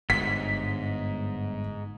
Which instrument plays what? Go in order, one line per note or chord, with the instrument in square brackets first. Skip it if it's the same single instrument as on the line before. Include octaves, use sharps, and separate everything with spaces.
[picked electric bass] G1 [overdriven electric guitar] G#2 [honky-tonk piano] B6